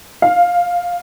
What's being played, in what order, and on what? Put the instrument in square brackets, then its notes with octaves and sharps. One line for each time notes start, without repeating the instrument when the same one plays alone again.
[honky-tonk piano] F5